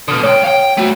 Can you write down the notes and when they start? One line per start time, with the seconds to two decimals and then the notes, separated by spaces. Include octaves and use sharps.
0.08 B2 D3 D#6 F6
0.23 C#2 C#5 G5
0.44 C#5 F5 G5
0.78 A3 F#4